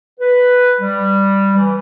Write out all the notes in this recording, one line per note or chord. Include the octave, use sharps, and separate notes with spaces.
B4
G3
E3